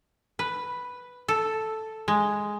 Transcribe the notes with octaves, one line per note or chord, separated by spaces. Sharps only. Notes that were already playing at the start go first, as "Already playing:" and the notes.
B4
A4
G#3